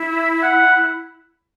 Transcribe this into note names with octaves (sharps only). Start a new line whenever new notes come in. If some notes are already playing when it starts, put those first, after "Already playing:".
Already playing: E4
F#5